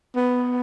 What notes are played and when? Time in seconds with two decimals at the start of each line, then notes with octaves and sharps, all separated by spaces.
0.16 B3